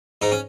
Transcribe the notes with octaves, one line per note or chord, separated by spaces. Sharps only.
G#2 D#4
C#4